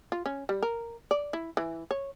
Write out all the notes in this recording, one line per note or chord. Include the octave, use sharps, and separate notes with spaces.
F4
C#4
G3
A#4
D5
E4
E3
C#5